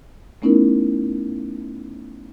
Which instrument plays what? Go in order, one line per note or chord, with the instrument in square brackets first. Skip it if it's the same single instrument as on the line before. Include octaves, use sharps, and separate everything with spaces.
[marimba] A3 B3 C#4 D#4 E4 A#4